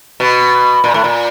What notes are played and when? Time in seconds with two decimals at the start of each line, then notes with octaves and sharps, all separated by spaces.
0.20 B2
0.84 A#2
0.94 A2
1.04 A#2